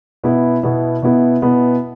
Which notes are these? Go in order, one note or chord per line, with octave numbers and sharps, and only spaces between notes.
B2 B3 E4
B2 B3 E4
B2 B3 E4
B2 B3 E4